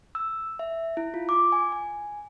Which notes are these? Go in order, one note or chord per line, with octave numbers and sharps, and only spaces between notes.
E6
E5
E4
F4
D6
G#5
G#5